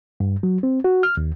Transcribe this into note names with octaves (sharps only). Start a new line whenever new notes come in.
G2
F#3
C4
F#4
F6
D#2